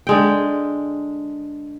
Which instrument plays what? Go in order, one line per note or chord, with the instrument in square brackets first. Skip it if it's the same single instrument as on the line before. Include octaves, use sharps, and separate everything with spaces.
[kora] D3 G#3 G5